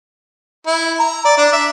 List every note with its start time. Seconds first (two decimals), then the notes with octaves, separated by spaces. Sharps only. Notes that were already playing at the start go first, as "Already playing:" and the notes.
0.66 E4
0.99 A#5
1.25 D5
1.38 D4
1.52 E5